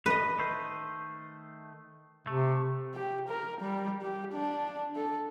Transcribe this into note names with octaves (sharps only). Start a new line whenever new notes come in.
A2 B4 D#5
D#3 A3 C5
C3 A3
G4
A#4
G3
G4
D4
A4